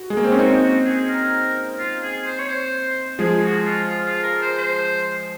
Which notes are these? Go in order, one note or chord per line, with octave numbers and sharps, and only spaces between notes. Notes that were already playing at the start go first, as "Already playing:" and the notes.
Already playing: F#4
G#3
A#3
C4
C#4
C4 D#4 F#4
F#4
G#4
A#4
F4
G#4
C5
C#5
C5
F3 G#3 G#4
F#4
F4
F4
F4
A#4
C5
C5